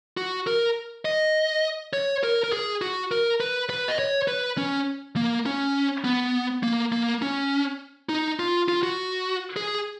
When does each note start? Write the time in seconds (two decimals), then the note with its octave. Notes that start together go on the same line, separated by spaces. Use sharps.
0.17 F#4
0.47 A#4
1.05 D#5
1.93 C#5
2.23 A#4
2.44 A#4
2.53 G#4
2.82 F#4
3.11 A#4
3.40 B4
3.70 B4
3.88 D#5
3.99 C#5
4.28 B4
4.58 C#4
5.16 A#3
5.46 C#4
6.04 B3
6.63 A#3
6.92 A#3
7.22 C#4
8.09 D#4
8.40 F4
8.68 F4
8.83 F#4
9.56 G#4